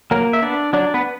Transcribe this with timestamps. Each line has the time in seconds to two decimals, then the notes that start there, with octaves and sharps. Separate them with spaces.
0.11 F#3 A#3 A#4
0.33 E5
0.42 B3 D4 D5
0.73 F#3 D4 D5
0.94 B3 B4